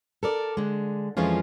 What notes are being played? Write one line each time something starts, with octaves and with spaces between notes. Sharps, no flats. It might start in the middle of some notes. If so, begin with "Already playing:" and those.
A4 A#4 D5
D3 G#3
F2 E3 F3 G#3 C#4 F4